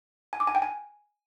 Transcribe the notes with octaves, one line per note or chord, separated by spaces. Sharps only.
G#5
D6
G#5
G5
G#5